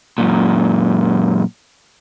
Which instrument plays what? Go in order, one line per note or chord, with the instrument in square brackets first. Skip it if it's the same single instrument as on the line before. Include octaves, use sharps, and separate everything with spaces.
[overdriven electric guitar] F#2 A#2